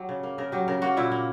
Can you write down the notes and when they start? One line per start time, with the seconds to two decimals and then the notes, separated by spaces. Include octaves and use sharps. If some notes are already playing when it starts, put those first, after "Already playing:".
Already playing: F#3 G4
0.09 C#3
0.23 A#3
0.38 C#3 A#4
0.52 F#3 G4
0.68 C#3 A#4
0.82 A#3 F#4
0.97 A#2 E4
1.11 A#3